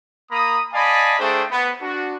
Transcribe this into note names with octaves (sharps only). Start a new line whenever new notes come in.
A#3 A#5 B5 D#6
D5 D#5 F5 G#5 A5 B5
A3 D4 G#4 C5 G5 A5
B3
D4 F#4